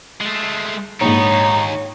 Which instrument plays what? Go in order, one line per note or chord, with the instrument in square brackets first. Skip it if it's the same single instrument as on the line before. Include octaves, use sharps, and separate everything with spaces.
[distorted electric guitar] G#3 A3 [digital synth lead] C7
[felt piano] A#1 G#2 [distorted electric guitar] G3 B3 [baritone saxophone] D#4 [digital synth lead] C#5
[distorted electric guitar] D#2